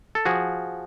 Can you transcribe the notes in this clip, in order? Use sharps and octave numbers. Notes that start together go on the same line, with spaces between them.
A4
F3 F#4 G#4